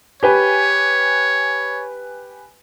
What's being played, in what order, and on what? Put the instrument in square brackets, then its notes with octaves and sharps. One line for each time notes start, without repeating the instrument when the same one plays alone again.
[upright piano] G4 B4 G#5 [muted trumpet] C#5